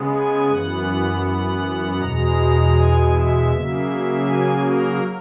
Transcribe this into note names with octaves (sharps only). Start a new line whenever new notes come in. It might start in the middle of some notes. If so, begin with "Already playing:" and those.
Already playing: C#3 G#3 B3
G#5
F#2 E3 B3 F#5
F#5
E2 B2 G#3 A#5
G#5
E5
C#3 F#3 A#3
G#5
A#4